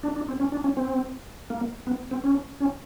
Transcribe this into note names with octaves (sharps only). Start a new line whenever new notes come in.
D4
D4
C4
C#4
D4
C#4
C4
A#3
B3
C4
C#4
C#4